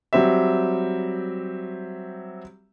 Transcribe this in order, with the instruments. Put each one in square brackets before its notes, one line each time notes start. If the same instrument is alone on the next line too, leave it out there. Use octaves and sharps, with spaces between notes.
[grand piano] F#3 G3 C4 G4 E5